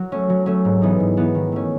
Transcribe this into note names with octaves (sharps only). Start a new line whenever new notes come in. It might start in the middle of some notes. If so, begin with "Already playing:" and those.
Already playing: F#3 F#4
A3 C#4
F#3
A3 C#4
G#2
E3 B3 D#4
G#2
E3 B3 D#4
D#3
A3 C#4